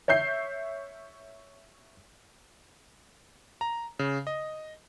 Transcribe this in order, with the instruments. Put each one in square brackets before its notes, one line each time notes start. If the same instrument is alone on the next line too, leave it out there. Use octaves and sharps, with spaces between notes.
[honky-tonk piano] C#5 E5 G6 C7
[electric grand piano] A#5
C#3
D#5